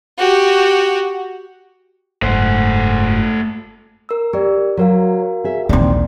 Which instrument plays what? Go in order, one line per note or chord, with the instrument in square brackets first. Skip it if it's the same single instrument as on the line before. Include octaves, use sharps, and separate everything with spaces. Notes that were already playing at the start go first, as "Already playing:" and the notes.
[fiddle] F#4 G4
[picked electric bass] F#1 G#2 [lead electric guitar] A3 C5
[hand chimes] A#4 E6
[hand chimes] G4 D5 [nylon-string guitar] A#4
[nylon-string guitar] F#3 [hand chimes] F#4 A#4 F5
[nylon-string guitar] G#4 E5
[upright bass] A#1 D#2 [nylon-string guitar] D#3 E3 C4 [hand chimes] D5